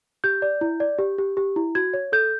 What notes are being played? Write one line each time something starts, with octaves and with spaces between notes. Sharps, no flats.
G4 G6
D5
E4
D5
G4
G4
G4
E4
F#4 G#6
C#5
A4 G6